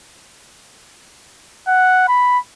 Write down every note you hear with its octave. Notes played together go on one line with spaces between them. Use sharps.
F#5
B5